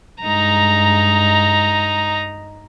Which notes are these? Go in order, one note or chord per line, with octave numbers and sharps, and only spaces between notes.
G2 G#3 D#4 A#5